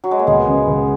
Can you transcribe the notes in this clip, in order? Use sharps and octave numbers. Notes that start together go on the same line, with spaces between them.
F#3
G#3
A#3
C#2 G#3 B3
C#3
C#2